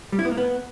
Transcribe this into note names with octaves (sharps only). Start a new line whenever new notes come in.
G3
E4
B3
A#3
B3